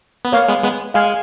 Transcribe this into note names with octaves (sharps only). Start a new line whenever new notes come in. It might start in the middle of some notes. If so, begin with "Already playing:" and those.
B3
A#3 C#5 F5
G#3 B3
G#3 B3
G#3 F5 G#5